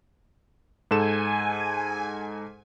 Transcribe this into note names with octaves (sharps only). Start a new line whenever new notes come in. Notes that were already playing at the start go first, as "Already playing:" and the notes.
G#2 A4 G#5 E7